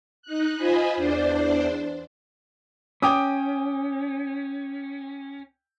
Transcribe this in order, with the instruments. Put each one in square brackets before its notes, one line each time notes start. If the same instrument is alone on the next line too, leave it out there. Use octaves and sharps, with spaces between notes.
[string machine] D#4 F#6
F4 C5 D#5 G#5 B5
E2 D4 C5 D5
[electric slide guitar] C#4 [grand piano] G5 D6 D#6